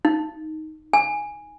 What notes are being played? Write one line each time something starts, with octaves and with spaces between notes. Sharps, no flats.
D#4
G#5